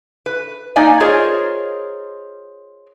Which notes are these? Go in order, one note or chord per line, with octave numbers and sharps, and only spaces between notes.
B4
A#3 D#4 D5 D#5 G#5
F4 G#4 A#4 C5 C#5 D#5